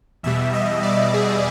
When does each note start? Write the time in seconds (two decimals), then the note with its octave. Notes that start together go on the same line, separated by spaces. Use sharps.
0.23 E2 B2 G3 E5
0.53 D#5
0.83 D5
1.14 G#4